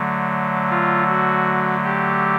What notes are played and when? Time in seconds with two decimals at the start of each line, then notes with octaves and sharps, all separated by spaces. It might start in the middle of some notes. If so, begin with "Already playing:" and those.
Already playing: D3 F#3 A3
0.70 F4
1.08 F#4
1.84 G4